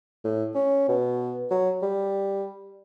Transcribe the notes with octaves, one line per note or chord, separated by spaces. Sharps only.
A2
C#4
B2
F#3
G3